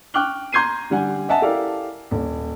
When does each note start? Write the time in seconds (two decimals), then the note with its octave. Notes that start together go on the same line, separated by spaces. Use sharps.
0.14 G5 C#6 D6 F6 F#6 G7
0.52 A#5 C6 G6 G#6 C7 D#7
0.90 D3 G3 F#5 G#5
1.29 D#5 E5 F#5 G#5 A5
1.42 E4 G4 A4 A#4 D5 F5
2.11 D#1